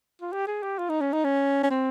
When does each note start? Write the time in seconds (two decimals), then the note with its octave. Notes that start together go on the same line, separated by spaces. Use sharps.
0.21 F4
0.32 G4
0.47 G#4
0.63 G4
0.78 F4
0.89 D#4
1.01 C#4
1.13 D#4
1.24 C#4
1.63 C#4
1.70 C4